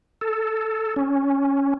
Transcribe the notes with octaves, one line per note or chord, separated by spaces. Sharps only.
A4
C#4